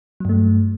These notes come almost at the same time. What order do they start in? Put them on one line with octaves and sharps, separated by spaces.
F#3 G2 A3